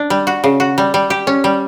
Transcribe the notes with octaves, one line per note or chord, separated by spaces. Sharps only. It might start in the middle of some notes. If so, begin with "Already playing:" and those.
Already playing: D4
G3
F#4
C#3
F#4
G3
G3
G4
C#4
G3